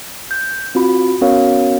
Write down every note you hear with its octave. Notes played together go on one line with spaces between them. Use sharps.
G6
C4 F4 F#4 B5
B3 C#4 F#4 A#4 C#5 F5